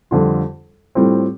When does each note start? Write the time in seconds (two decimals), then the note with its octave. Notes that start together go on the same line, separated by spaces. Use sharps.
0.11 F2 D3 G3 F4
0.95 A2 G3 C4 F4